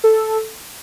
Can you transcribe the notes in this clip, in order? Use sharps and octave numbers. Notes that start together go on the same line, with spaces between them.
A4